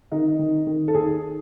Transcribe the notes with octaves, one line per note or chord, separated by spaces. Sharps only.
D#3 D#4
D#3
D#3
A4
D#2 G#4